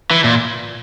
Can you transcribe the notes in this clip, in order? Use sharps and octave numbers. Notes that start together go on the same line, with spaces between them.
E3
A#2